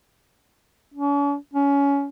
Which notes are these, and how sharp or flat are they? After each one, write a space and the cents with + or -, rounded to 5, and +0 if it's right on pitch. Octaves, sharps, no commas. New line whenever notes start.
C#4 +45
C#4 +20